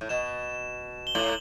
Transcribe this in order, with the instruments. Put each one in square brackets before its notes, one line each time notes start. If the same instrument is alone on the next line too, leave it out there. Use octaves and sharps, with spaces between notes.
[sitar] A2
[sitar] B2 [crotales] E7
[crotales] G7
[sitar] A2 [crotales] F#7